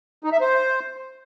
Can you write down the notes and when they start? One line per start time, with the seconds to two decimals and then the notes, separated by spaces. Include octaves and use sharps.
0.24 D#4
0.32 E5
0.40 C5